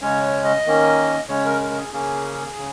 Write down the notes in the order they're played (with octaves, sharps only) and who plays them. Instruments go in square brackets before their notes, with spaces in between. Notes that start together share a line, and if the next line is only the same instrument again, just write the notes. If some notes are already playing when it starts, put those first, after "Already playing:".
[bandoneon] C#3 G#3 C#4 C#5
C#5
D#5
D#3 A#3 C#4
C#3 G#3 C#4 C#5
A#4
A#4
A#4
G#4
C#3 A#3 C#4 G#4
C#3